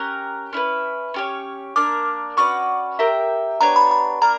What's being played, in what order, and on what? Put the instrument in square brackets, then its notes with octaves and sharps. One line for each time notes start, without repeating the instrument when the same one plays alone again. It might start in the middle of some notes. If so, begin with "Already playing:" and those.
Already playing: [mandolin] C#4 G4 A#4 [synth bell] F#6
[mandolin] C#4 E4 B4
C#4 G4 C#5
[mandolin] A#3 D4 A#4 [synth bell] D6
[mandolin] C#4 F#4 B4 D5 [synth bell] C#6
[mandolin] G4 A#4 E5 G5
[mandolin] B3 D4 G4 C#5 [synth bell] A#5
[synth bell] B5
B5
[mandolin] A#3 D4 A#4 [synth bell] A#5